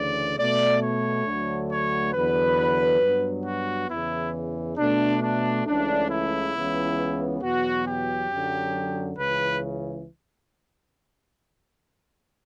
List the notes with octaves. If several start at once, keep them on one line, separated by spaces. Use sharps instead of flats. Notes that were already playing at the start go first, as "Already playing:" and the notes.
Already playing: D2 C#3 E3 D5
B2 A3 D5
C#5
D2 D3 F#3 A3
C#5
E2 D3 F#3 B4
G2 F#3 B3
F#4
E2 C#3 E3 E4
B2 A3 D4
D4
C#2 C#3 E3 A3 D4
E4
C#2 C#3 E3 B3
E2 B2 F#3 B3 F#4
G4
F#2 D3 F#3
C#2 C#3 E3 B4